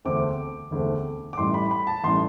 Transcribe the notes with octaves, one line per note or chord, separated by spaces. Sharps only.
E1 D2 D3 A3 C4 D6
E1 D2 D3 A3 C4
D6
A1 A2 G3 C6
B5
B5
A5
A1 A2 G3 C6